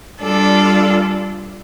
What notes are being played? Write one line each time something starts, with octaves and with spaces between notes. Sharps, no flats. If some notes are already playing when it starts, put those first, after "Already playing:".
G3 D4 F4 A4 D5